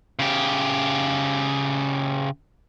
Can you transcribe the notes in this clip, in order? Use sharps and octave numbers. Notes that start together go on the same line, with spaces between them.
C#3 G4